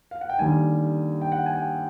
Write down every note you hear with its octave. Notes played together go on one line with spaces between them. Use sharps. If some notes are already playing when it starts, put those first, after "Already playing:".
F5
F#5
G5
D#2 D3 G3 A#3 D#4 G#5
G5
F#5
G#5
G5